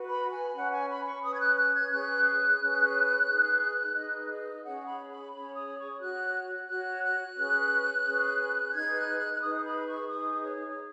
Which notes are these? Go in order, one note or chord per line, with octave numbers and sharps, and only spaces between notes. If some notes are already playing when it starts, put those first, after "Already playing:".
Already playing: F#4 B4
B5
G#5
C#4 B4 F#5
G#5
B5
C#6
C#4 B4 D#6
G#6
F#6
F#6
G#6
C#4 G#4 B4 F#6
F#6
C#4 G#4 B4
D#4 G#4 B4
D#4 G#4 B4 D#5
D#5
C#4 G#4 C#5 F#5
B5
B5
C#4 G#4 C#5 B5
D#6
C#6
F#4 C#5 F#6
F#4 C#5 F#6
F#6
C#4 G#4 B4
C#4 G#4 B4
D#4 G#4 B4 G#6
F#6
F#6
F#6
D#4 G#4 B4 D#6
B5
C#6
D#4 G#4 B4 D#6
C#5